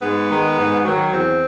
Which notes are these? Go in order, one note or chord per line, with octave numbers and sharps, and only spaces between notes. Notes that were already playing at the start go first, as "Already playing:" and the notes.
G#2 B3
D#3 G#3
G#2
D#3 F#3
E2 C4